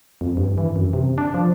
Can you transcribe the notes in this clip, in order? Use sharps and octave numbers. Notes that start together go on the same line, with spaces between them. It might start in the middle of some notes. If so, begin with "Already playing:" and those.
F2
G2
E3
F#2
C3
D4
F3